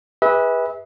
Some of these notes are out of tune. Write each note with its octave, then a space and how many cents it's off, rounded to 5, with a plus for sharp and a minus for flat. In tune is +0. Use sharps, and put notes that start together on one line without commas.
G#4 -35 B4 -10 E5 -35